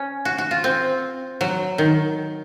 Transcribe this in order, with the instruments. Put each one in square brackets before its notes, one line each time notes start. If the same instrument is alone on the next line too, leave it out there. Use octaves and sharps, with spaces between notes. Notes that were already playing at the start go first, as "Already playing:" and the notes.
Already playing: [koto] C#4
F#4
F#4
F4
C4
F#3
D#3